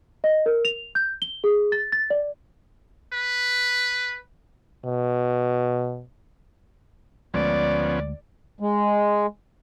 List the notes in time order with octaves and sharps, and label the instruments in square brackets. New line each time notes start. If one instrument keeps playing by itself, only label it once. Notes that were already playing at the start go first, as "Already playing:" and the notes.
[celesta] D#5
A#4
F7
G6
G7
G#4
A6
A6
D5
[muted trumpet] B4
[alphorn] B2
[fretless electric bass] D2 G#3 A3 [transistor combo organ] F3 B3 C#4 [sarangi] D5
[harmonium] G#3